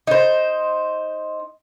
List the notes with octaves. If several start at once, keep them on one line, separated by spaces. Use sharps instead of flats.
D#4 C5